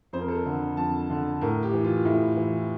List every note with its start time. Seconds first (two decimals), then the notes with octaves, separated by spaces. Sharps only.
0.13 F2 C5
0.21 A#4
0.28 A4
0.36 A#4
0.46 D3
0.77 F2 A5
1.10 D3
1.41 A2 A#4
1.63 G4
1.73 E3
1.84 F4
2.05 A2 E4
2.37 E3